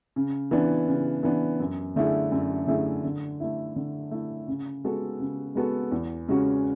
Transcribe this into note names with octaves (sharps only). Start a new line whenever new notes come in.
C#3
E3 B3 D4
C#3
E3 B3 D4
F#2
D3 A3 E4 G#4
F#2
D3 A3 E4 G#4
D3
A3 E4
D3
A3 E4
C#3
G#3 B3 F#4 A4
C#3
G#3 B3 F#4 A4
E2
C#3 G#3 C#4 F#4